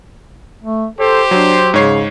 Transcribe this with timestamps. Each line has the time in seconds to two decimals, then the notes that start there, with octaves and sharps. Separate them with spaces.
0.62 A3
0.99 G4 A4 C5
1.31 F#3 D4
1.74 G#2 C#3 C#5 C7